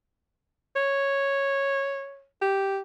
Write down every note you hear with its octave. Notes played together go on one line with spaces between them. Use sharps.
C#5
G4